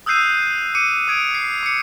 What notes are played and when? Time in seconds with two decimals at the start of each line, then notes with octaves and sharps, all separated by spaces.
0.06 D#6 E6 F#6 G6 C7 D#7
0.75 D6 C#7 D#7
1.08 D#6 G#6 D7
1.35 C7
1.63 D6 C#7